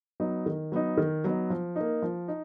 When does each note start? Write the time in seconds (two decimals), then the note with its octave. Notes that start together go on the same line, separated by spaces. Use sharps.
0.20 F#3 B3 D#4
0.46 D#3
0.72 F#3 B3 D#4
0.97 D#3
1.24 F#3 B3 D#4
1.50 F3
1.76 A#3 D#4
2.02 F3
2.28 D#4